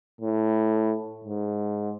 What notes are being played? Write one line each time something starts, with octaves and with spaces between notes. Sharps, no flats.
A2
G#2